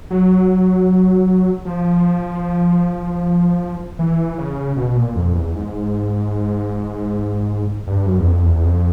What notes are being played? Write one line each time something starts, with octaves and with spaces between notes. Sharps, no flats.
F#3
F3
E3
C#3
B2
A#2
F2
E2
G#2
G2
F#2
E2
F2
E2
F2